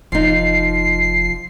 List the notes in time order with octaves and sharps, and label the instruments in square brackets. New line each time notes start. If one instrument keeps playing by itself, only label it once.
[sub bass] F1 [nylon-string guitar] F3 D#4 [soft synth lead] C7